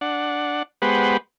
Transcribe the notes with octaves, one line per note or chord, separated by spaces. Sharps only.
D4 F#5
G#3 B3 G4 B4 C5 F#5